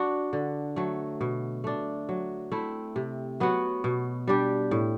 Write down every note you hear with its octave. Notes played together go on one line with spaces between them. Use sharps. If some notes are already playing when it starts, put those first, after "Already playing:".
Already playing: D4 F#4
D3
F#3 A3
B2
A3 D4
F#3
A3 C4 E4
C3
F#3 B3 F#4
B2
G3 D4 G4
A2